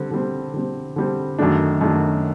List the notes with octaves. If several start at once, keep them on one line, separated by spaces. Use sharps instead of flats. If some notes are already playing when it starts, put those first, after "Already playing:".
Already playing: D3 G3 C4
D3 G3 C4
D3 G3 C4
D3 G3 C4
F#2 D#3 F#3 A3 D4
F#2 D#3 F#3 A3 D4